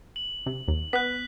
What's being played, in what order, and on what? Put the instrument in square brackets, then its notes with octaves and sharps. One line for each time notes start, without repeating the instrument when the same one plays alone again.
[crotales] F#7
[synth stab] C3
D#2
[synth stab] B3 [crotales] F#6 B6